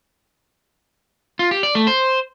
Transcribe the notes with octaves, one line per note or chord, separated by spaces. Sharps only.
F4
G4
D5
A3
C5